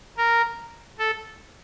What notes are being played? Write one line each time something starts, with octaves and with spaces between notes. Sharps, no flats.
A#4
A4